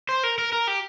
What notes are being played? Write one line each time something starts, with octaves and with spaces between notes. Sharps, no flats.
C5
A#4
A#4
A#4
G4